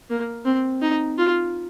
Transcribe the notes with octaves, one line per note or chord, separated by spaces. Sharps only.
A#3
C4
D#4
F4